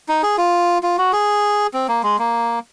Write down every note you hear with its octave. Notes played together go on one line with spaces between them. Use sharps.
D#4
G#4
F4
F4
F#4
G#4
C4
A#3
G#3
A#3